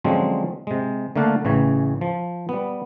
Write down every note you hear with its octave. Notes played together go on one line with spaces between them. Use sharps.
D3 F3 F#3 G#3 C4 C#4
C3 G#3
D3 A3 A#3 F5 F#5 A5
A1 C#3 E3 C#5
F3
G3 B3